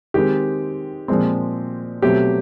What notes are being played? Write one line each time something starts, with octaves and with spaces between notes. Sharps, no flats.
D#3 G#3 C4 G4
A#2 F3 G#3 C4
B2 F#3 A3 C4 G4